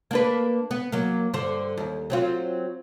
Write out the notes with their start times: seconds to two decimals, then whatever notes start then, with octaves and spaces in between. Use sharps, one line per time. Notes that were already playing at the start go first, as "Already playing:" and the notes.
0.11 A#3 D4 B4
0.71 B3
0.92 F#3 A#3
1.33 G2 D3 C5
1.77 D#2
2.10 F#3 C4 F4